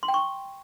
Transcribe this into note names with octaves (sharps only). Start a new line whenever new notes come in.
C6
G5
C#6